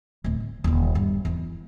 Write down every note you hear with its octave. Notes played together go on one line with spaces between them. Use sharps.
D1 A2
D3
D#1 D3
G2
E2 E4